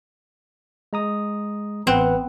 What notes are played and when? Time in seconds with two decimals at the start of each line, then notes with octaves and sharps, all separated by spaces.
0.93 G#3 A#5 D#6
1.87 A1 B3 C4 F#5 F#6